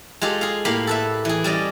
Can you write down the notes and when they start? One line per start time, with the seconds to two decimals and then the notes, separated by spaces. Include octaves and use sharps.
0.21 G#3 F4 G4 A4
0.41 G#4 F5
0.65 A2 A#3 G4 F5 B5
0.87 A4 B4 E5
1.25 E3 G#4
1.44 G3 C#4 D5 D#5